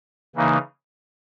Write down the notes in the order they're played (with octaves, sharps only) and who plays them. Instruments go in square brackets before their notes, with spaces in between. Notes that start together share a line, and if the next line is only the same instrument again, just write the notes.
[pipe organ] C#3 E3 A#3 D#4